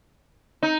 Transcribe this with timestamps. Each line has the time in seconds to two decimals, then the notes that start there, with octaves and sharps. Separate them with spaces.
0.63 D#4